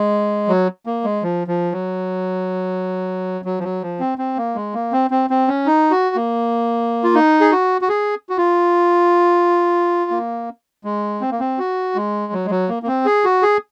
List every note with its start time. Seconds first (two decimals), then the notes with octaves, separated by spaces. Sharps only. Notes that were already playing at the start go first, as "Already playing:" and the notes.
Already playing: G#3
0.48 F#3
0.86 A#3
1.04 G#3
1.23 F3
1.47 F3
1.72 F#3
3.45 F#3
3.59 F3
3.63 F#3
3.82 F3
4.00 C4
4.18 C4
4.37 A#3
4.55 G#3
4.74 A#3
4.92 C4
5.11 C4
5.30 C4
5.48 C#4
5.66 D#4
5.91 F#4
6.16 A#3
7.04 F4
7.15 D#4
7.41 G#4
7.52 F#4
7.81 F#4
7.89 G#4
8.29 F#4
8.37 F4
10.11 A#3
10.84 G#3
11.21 C4
11.31 A#3
11.40 C4
11.59 F#4
11.95 G#3
12.33 F#3
12.45 G#3
12.50 F#3
12.69 A#3
12.83 A#3
12.87 C4
13.06 G#4
13.24 F#4
13.42 G#4